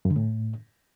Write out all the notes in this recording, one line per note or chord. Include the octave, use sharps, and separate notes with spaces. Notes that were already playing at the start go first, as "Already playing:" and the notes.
F#2
D3
A2